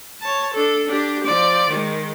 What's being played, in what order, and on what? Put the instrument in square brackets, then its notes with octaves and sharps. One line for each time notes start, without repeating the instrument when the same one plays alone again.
[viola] C#5 A5
D4 A4
D4 G4
F3 D5
D#3 G#3